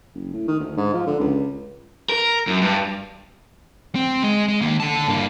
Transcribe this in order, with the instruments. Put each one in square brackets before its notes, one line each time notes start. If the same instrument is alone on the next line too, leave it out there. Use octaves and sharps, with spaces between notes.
[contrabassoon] F#1
A2
D#3
D2
G#2
F3
D3
C#2
[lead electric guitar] A#4
F#2
G2
C4
G#3
G#3
D#3 A#3
D3 A5
G2 A#3